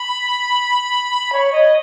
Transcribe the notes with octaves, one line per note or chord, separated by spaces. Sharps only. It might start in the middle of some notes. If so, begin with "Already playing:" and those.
Already playing: B5
C#5
D#5